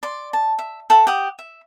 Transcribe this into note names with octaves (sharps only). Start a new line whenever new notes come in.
D5 C6
A5
E5
A4 E5 F#5
G4 F#5 D#6
E5